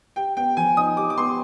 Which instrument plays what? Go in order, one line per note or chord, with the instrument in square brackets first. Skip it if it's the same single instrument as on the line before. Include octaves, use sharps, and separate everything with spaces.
[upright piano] G4 [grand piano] G5
[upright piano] B3 [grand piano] G5
[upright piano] F3 [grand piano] G#5
[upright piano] D#4 [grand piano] D#6
[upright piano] G4 [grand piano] D6
[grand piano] D6
[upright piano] B3 [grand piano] C6